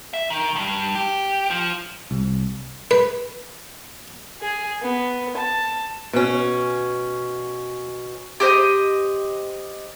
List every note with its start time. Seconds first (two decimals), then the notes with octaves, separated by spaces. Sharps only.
0.14 E5
0.30 D#3
0.56 G2
0.95 G4
1.50 F3
2.11 C2
2.91 B4
4.41 G#4
4.82 B3
5.37 A5
6.13 B2 C#4
8.40 G4 C5 D#5